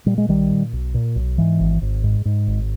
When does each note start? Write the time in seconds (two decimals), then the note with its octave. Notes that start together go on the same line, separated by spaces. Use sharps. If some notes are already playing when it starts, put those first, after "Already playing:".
0.06 A#2 G3
0.18 G#3
0.28 B1 D#3 G3
0.50 A#2
0.73 B1
0.94 A#2
1.16 B1
1.38 G#2 E3
1.60 G#1
1.81 G#1
2.03 G#2
2.25 G#2
2.47 G#1